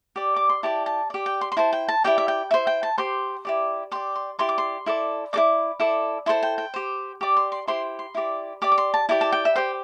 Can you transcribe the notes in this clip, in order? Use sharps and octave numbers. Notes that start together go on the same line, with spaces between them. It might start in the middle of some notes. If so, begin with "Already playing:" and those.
G4 D5
D6
C6
E4 G4 D5 A5
A5
G4 D5
G5
C6
C6
E4 C5 A5
G5
A5
E4 G4 D5 G5
E5
G5
E4 C5 E5
G5
A5
G4 C5 C6
E4 G4 D5
G4 D5 C6
C6
E4 G4 D5 C6
D6
C6
E4 A4 D5
E4 A4 D5 D6
E4 A4 D5
E4 A4 C5 C6
G5
G5
G4 C5
G4 D5 D6
C6
C6
E4 G4 C5 C6
C6
E4 G4 D5
G4 D5 D6
D6
C6
A5
E4 G4 D5 A5
A5
G5
E5
G4 C5 G5